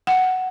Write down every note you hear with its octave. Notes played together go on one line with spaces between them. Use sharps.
F#5